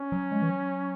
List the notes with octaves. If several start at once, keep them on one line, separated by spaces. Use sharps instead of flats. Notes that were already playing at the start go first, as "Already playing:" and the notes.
Already playing: C#4
F#3
G#3
E3
F#3